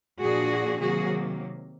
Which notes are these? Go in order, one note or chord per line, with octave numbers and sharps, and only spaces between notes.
A#2 F3 A#3 D4 F#4 G#4
C3 D#3 F#3 A#3 F#4 G#4